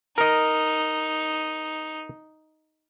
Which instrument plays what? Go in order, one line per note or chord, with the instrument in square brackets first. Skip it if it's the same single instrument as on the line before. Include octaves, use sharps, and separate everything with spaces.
[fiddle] D#4 [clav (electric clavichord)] A#4 D#5